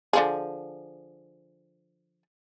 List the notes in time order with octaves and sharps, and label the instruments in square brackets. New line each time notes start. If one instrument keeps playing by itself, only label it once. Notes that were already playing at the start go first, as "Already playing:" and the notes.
[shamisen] D3 F3 G#4